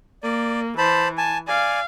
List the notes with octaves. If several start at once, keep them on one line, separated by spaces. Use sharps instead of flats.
A#3 D5
E3 C5 A5 B5
G#5 A5
D5 F5 G#5